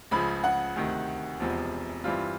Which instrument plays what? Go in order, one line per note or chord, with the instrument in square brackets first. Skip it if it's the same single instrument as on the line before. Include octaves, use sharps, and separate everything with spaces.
[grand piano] C#2 C#3 F3 [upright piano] B5
[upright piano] F#5
[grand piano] D2 C3 D#3
E1 E2 C3 F3
[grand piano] G2 E3 G3 C4 F4 [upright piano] F5